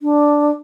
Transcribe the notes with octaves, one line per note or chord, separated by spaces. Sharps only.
D4